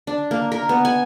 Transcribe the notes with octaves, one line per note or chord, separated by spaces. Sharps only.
D4
A#3
A#4
B3
G#5